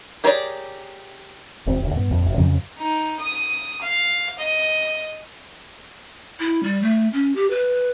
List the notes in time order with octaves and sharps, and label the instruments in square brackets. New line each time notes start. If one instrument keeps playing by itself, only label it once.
[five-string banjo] G4 G#4 A#4 C#5 D5
[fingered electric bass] E1 E2 C4
D#1 D2
G2 B3
A#1 F2
F#1
F2 C#3 F3 F#3
[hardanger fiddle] D#4
D#6
F5
D#5
[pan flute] E4
G3
A3
C#4
G4
B4